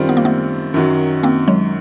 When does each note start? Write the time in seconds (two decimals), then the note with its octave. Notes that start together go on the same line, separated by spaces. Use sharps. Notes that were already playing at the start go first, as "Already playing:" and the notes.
Already playing: F#2 D#3 G3 C4 F4
0.09 B3
0.17 A#3
0.25 A3 B3
0.74 F#2 D#3 F#3
1.23 A#3 C4
1.48 F#3 G#3